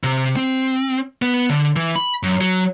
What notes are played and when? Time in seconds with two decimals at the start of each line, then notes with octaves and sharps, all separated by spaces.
0.04 C3
0.36 C4
1.22 B3
1.50 D3
1.76 E3
1.96 B5
2.23 F#2
2.41 F#3